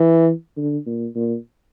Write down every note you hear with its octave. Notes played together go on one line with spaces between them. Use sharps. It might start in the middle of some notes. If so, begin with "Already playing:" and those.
Already playing: E3
D3
A#2
A#2